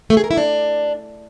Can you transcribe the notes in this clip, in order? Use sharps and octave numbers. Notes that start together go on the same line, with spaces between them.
A3
G#4
A#4
E4
D4